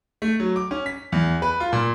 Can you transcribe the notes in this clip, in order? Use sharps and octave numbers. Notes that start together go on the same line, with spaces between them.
A3
F#3
D6
C#4
B6
E2
B4
F4
A#2